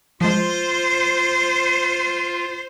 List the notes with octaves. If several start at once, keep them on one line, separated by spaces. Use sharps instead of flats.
F3 G#3 F4 C5